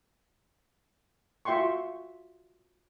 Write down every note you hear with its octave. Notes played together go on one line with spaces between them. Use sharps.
F4 F#4 E5 G5 C6 C#6